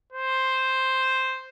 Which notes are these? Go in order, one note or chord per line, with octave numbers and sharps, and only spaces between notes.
C5